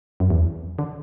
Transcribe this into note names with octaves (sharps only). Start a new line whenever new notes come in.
F#2
E2
D3